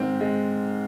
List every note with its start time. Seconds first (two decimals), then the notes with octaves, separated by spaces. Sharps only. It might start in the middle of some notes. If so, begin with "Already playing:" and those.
Already playing: G#2 D#3 G#3 C4
0.21 G#3